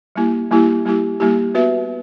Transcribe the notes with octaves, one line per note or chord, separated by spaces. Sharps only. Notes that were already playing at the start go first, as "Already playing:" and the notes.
G3 A#3 E4 G4
G3 A#3 E4 G4
G3 A#3 E4 G4
G3 A#3 E4 G4
B3 F#4 B4 E5